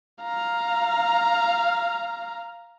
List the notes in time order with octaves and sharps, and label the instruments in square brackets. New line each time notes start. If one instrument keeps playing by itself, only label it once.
[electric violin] F5 A#5